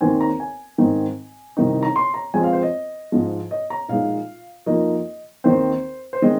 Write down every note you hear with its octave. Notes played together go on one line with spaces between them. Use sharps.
D#2 D#3 C4 G#5
A#5
G#5
G#2 D#3 C4 D#4
C2 C3 D#3 C4 D#4
A#5
C6
A#5
F2 F3 G#3 C4 G#5
F5
C5
D#5
G#2 F3 G#3
D#5
A#5
A#1 A#2 G#3 D#4 F5
F2 F3 A#3 D#4 D#5
D#2 D#3 C4 C5
C5
D#3 G#3 C4 D#5